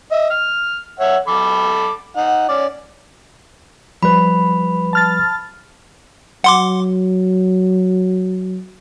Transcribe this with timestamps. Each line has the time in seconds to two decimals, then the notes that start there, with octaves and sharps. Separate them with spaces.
0.11 D#5 E5
0.30 F6
1.00 C#5 E5 F#5
1.28 A4 B5 D6
2.16 D#4 F#5
2.48 C#4 D5
4.03 F3 G3 B4 B5
4.93 A5 F6 A6
6.44 F#3 F#5 C6 D6